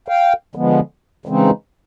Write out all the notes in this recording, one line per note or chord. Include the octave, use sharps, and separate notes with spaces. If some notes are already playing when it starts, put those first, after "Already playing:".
F5 G5
D3 F3 G#3 B3
C#3 E3 G#3 C4 D#4